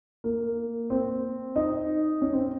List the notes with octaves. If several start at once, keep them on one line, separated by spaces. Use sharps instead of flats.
A#3
C4
D#4
C#4
C4